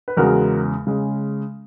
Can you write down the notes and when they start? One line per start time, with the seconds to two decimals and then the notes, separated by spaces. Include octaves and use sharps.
0.08 B4
0.17 E2 C#3 G#3 F#4 A#4
0.87 C#3 G#3